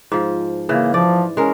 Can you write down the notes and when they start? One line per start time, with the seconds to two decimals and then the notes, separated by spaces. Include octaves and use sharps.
0.12 G#2 F3
0.69 C#3 E3 A#3
0.94 F3 D5
1.37 G#3 C#4 A#4